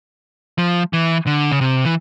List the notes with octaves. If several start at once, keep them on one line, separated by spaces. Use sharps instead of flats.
F3
E3
D3
C#3
C3
E3